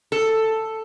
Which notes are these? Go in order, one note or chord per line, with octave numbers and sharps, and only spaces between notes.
A4